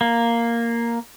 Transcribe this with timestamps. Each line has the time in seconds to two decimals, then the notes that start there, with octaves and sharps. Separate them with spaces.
0.01 A#3